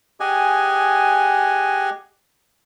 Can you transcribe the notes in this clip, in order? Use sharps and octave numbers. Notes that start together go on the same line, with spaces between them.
G4 G#4 D#5 F#5 G#5